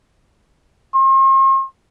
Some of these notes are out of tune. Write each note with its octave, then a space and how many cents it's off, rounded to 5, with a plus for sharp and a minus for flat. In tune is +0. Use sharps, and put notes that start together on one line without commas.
C6 +45